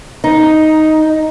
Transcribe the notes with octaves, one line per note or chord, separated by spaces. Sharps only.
D#4